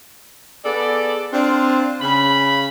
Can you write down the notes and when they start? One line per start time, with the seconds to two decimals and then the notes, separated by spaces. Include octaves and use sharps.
0.65 B3 G#4 A4 D5
1.33 C4 D4 F4
2.01 C#3 B5